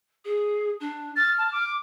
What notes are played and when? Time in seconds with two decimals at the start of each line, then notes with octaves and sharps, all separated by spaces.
0.25 G#4
0.80 D4
1.16 F6 A6
1.38 A5
1.52 D6